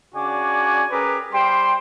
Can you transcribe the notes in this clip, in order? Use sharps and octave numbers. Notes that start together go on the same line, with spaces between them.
C#3 D4 F#4 D5 G#5
C#4 G4 G#4 A#4 B4
G3 C5 G5 C6